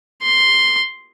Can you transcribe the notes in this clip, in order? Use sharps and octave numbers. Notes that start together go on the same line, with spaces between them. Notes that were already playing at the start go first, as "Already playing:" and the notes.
C6